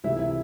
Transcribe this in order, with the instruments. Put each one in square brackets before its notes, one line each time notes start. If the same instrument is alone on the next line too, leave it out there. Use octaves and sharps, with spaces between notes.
[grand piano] C#2 C3 E3 A3 [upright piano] E4
[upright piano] E4